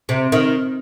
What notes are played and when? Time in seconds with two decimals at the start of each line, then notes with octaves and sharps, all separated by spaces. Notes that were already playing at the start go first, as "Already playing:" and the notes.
0.09 C3
0.32 D#3